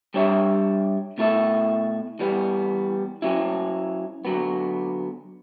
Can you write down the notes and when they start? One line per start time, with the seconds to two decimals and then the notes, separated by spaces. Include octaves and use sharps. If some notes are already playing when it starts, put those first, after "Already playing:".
0.14 G3 D4 G4 C#5 E5
1.18 B2 A3 E4 A4 E5
2.19 E3 G3 B3
3.22 F#3 C#4 E4
4.25 D3 F#3 B3